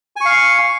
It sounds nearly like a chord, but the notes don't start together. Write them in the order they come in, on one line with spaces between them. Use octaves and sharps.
G#5 C#6 F5